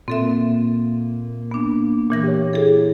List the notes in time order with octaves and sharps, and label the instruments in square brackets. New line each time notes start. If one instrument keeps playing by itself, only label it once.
[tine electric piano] A#2 [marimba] C4 A4 E5
[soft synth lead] A#3
[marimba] B3 D4
A#2 E3 A#6
[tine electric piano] G4 C#5
[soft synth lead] E4 [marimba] G#4 A4